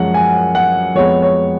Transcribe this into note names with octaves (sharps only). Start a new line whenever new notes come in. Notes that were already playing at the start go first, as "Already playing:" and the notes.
Already playing: F#2 F3 G#3 C#4 F#5
G#5
F#5
F2 F3 G#3 B3 C#5
C#5